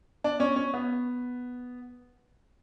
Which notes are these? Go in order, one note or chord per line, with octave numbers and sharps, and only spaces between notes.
D4
C#4
C#4
B3